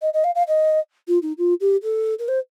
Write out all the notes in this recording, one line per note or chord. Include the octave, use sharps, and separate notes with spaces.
D#5
D#5
F5
F5
D#5
F4
D#4
F4
G4
A4
A#4
C5